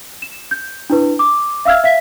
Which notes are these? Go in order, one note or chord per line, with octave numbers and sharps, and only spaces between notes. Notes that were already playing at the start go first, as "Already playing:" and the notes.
E7
G6
D4 E4 B4
D6
E5 F5 E6 F6 G#6
E5 F5 B6